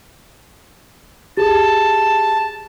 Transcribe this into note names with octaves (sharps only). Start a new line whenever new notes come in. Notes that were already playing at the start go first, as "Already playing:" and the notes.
G4 G#4 A5